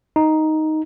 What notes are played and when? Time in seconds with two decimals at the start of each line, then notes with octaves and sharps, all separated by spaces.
0.16 D#4